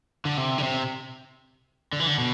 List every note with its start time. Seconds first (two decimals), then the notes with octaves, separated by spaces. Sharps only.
0.25 D3
0.37 C3
0.58 D3
0.63 C3
1.93 D3
2.00 E3
2.07 D3
2.18 B2